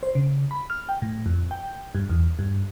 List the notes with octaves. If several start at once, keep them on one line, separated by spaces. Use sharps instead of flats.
C5
C#3
B5
F6
G5
A2
F2
G5
G2
E2
G2